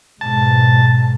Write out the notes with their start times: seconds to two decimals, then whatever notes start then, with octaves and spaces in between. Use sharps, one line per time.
0.21 G#2 B2 A5